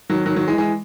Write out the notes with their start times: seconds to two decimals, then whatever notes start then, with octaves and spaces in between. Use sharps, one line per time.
0.09 D#3 F#3
0.26 D#3 F#3
0.36 D#3 F#3
0.47 E3 G#3
0.58 E3 G#3